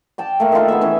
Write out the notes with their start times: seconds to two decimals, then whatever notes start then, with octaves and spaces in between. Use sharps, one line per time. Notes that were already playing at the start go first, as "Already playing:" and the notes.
0.18 D5 G5 A5
0.40 A3 A#3
0.52 D#3 D4 F4 A4
0.68 B3 G#4 A4 E5
0.81 E3 C#4